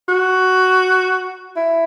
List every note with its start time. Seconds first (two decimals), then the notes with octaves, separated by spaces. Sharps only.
0.08 F#4
1.56 E4